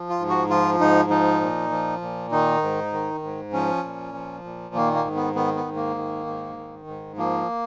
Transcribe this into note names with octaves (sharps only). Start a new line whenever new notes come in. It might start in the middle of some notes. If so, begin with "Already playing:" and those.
Already playing: F3
F4
G#2
F#4
F3 F4
G#2 D#4
F3 D#4
A#2
F3
A#2
D#3 D#4
G#2
D#3
G#2
F3 C#4
A#2
F3
A#2
D#3 A#3
A#3
G#2
B3
D#3 B3
B3
G#2
A#3
D#3
G#2
D#3
G#2
F3 A#3